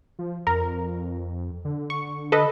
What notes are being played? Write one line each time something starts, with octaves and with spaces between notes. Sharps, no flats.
F3
F2 A#4
D3
C#6
A4 B4 D#5